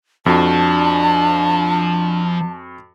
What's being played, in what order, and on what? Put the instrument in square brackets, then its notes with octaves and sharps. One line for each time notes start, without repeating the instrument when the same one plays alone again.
[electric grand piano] F2 F#4 [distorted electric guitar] F3 [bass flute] D4 [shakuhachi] A5